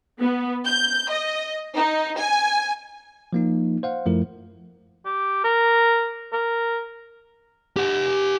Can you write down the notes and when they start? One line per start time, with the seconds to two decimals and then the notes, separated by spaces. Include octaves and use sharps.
0.19 B3
0.66 G6
1.10 D#5
1.75 D#4
2.17 G#5
3.33 F3 A#3 D#4
3.83 C5 F5 F#5
4.06 F#2 F3 A3 E4 A#4
5.06 G4
5.44 A#4
6.33 A#4
7.77 G4 F#5